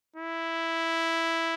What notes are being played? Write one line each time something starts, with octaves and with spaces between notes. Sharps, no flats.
E4